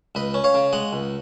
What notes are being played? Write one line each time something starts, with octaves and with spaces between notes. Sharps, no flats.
C#2 B4 D#5
C#4
C#5 F5
C#3
G#3 D#5 F#5
C#2